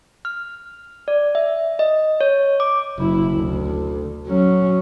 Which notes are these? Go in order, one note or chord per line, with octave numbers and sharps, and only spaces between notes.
F6
D5
E5
D#5
C#5
D6
F#1 E4
D2
F#3 C#4